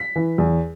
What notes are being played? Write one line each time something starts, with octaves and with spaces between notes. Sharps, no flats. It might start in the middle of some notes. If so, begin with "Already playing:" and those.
Already playing: B6
E3
E2